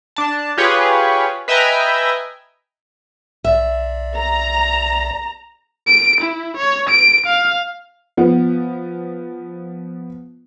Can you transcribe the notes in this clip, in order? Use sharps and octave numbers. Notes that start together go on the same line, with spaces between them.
D4 A5
F4 G4 G#4 B4 C#5
B4 D#5 E5 G5 G#5 A#5
B1 D5 E5
A#5
D7
E4
C#5
D7
F5
F3 B3